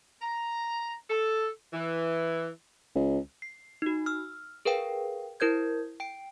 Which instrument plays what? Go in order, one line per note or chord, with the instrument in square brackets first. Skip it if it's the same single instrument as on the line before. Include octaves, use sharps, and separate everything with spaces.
[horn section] A#5
A4
E3
[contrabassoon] C#2
[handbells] C7
D#4 F#4
E6 F6
G#4 A#4 B4 F5 G5
E4 A#4 C5 G6 G#6
G5 D7